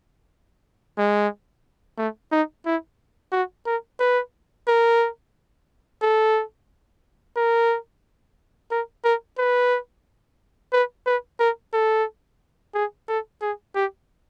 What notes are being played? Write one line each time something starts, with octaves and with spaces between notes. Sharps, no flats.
G#3
A3
D#4
E4
F#4
A#4
B4
A#4
A4
A#4
A#4
A#4
B4
B4
B4
A#4
A4
G#4
A4
G#4
G4